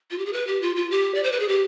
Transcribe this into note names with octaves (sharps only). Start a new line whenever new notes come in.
F4
G4
G#4
B4
G4
F4
F4
G4
D5
C5
B4
G#4
G4